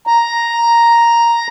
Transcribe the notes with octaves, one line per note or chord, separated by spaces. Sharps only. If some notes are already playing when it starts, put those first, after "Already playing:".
A#5